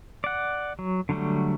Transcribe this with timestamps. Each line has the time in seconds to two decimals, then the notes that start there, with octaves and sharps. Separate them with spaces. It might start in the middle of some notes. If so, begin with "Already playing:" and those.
0.24 D5 F#5
0.79 F#3
1.09 D3 F#3 G3 A3